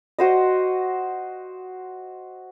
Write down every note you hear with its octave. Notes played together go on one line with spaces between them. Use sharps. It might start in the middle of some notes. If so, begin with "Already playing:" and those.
F#4 C5 D#5